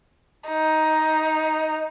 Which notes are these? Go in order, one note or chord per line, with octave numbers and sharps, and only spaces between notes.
D#4